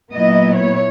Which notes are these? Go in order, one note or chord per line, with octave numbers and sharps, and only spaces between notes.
A#2 F#3 B3 E4 D#5
C#5